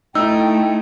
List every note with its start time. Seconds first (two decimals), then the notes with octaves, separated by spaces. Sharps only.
0.15 A3 D#4 E4 G5 E6